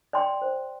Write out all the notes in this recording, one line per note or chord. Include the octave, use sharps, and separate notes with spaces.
D5 G5 C6
C5